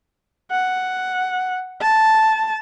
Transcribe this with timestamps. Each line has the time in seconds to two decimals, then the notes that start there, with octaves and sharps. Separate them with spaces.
0.51 F#5
1.81 A5